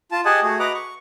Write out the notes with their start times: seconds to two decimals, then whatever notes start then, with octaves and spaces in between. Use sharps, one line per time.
0.11 F4 A5
0.25 G4 G#4 D#5 F#5 G#5 A5
0.43 A3 F#4 G#4
0.59 F#4 B4 D#5 F#5 A#5 D6
0.74 C#6